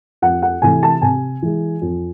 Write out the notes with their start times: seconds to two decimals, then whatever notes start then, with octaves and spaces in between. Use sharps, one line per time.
0.22 F2 F#5
0.42 F#5
0.62 C3 E3 A3 G#5
0.83 A5
1.02 C3 G#5
1.42 E3 G#3
1.82 F2